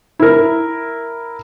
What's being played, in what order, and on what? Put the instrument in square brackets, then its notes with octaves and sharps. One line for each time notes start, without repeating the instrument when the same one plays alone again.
[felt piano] E4 A#4